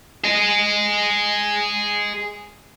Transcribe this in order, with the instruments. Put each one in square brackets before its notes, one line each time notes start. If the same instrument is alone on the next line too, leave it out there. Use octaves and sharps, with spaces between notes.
[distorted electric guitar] G#4 D#5